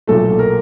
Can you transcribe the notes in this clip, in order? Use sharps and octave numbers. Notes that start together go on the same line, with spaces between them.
B1 A#2 F#3 A3 A4
A#4